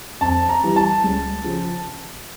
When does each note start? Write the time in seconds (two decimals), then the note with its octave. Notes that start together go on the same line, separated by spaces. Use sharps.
0.21 F2 A5
0.49 A#5
0.63 E3 G3
0.76 A5
1.04 C#2
1.44 C#3 F3